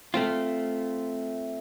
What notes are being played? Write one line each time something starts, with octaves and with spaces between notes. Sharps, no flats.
A3 C4 F4